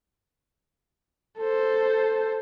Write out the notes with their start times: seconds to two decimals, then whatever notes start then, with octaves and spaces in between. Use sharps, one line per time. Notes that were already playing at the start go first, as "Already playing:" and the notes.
1.39 A4 C5